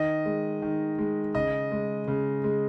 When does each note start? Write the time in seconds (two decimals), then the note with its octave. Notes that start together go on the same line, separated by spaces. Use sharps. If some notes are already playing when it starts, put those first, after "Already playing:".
Already playing: D#3 D#5
0.25 G#3
0.62 D#3
0.99 G#3
1.35 C#3 D#5
1.72 G#3
2.08 C#3
2.44 G#3